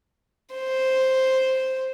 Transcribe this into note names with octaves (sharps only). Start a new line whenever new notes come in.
C5